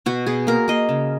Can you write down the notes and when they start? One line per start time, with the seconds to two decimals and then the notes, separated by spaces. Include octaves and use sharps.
0.06 B2 F#4
0.26 B2 G#4
0.47 A#3 A#4
0.68 A#3 D#5
0.89 C#3